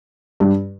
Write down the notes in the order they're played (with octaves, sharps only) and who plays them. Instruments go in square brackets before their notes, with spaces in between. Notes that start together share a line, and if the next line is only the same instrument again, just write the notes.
[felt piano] G2